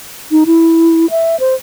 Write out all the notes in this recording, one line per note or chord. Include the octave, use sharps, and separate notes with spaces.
D#4
E4
E5
C5